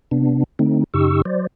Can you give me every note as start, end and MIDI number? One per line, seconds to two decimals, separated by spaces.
0.11 0.44 48
0.11 0.44 59
0.11 0.44 62
0.59 0.84 50
0.59 0.84 57
0.59 0.84 60
0.59 0.84 63
0.94 1.22 42
0.94 1.22 49
0.94 1.22 63
0.94 1.22 67
0.94 1.22 85
0.94 1.22 88
1.25 1.47 54
1.25 1.47 72
1.25 1.47 74